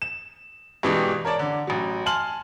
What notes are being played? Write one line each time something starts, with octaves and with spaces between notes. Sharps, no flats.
E7
G2 B2 E3 G#3 G4
A#4 C#5 D5 A5
D3
A1 F#3
G#5 A5 C6 F6 F#7